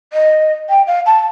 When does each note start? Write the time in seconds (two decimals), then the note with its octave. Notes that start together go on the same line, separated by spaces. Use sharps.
0.13 D#5
0.69 G5
0.87 F5
1.06 A5